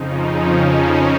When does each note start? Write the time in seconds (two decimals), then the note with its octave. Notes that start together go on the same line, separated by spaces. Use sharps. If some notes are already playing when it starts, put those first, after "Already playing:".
Already playing: F2 C#3 F3 D#4
0.22 C#4